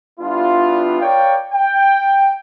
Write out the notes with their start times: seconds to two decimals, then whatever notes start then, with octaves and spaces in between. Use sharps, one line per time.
0.20 G3 B3 D4 E4 F4
1.01 A#4 C#5 D5 F5 G5
1.52 G5